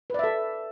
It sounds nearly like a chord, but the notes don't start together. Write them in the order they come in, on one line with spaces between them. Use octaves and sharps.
B4 D5 E5 A4